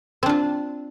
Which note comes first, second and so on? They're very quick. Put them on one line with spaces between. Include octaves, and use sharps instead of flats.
C4 D4 F4